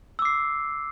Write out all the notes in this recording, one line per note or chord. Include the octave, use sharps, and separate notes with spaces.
D6 E6 C7